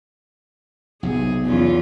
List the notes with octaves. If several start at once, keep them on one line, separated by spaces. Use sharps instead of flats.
B1 C3 G#4
E2 C#4 F4